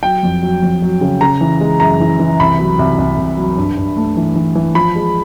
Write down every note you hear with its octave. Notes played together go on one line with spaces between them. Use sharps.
F#3 G5
F2
F#3
F2
F#3
C#3
C#3 A#5
E3
G#3
F#2 A#5
E3
E3
C2 B5
F#3
C2
C2
C2
F#3
G2
G2
A3
E3
E3
E3
F3 B5
G#3